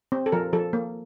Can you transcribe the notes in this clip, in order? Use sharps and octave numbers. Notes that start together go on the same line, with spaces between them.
C4
A4
F3 A#4
F3 A4
A#3